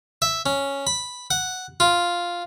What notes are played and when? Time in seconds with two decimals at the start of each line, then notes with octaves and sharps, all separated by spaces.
0.22 E5
0.46 C#4
0.87 B5
1.31 F#5
1.80 F4